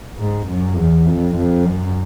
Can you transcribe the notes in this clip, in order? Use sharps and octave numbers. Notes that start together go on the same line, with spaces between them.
G#2
F#2
E2
F2
F2
F#2